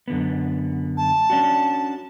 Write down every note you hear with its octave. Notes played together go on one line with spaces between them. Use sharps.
F#2 D3 B3
A5
C#4 D4 F#4